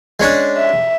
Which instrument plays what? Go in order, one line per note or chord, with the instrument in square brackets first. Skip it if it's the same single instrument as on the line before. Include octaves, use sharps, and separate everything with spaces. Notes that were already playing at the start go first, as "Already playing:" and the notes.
[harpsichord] G#3 C#4 D4
[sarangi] E5